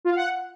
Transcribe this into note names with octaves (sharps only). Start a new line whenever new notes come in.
F4
F5
F#5